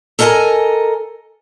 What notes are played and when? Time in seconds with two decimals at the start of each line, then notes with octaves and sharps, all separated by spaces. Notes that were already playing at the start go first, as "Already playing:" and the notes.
0.19 A4 A#4 D#5 G5 G#5 A#5